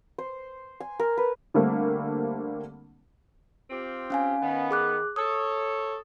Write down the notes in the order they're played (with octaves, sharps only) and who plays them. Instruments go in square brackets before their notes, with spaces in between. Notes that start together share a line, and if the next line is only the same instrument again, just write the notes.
[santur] C5
G#5
A#4
B4
[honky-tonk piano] D3 G3 A3 A#3 C4
[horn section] C4 F4 G4
[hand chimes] C#4 F5 G#5
[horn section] D#3 B3
[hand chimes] G#4 D6 F#6
[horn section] A4 C#5 [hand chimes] D#6